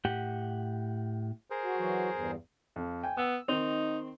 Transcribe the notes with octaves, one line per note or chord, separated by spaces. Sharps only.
A2 G4 F#5
G#4 A#4 C5
F#4
E3 F#3 F#4
E2 G2
F2
G5 G#5
B3 E6
D#3 C4 D#4